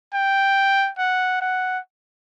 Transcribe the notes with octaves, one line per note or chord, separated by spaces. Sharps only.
G5
F#5
F#5